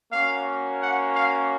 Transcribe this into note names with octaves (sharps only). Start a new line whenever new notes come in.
A#3 C#4 F#4 F5
F#5
F5